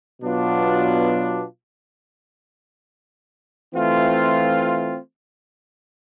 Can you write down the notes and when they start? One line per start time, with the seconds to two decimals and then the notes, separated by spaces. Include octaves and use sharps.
0.21 B2 F#3 B3 D4 F4
3.74 E3 A3 C4 F4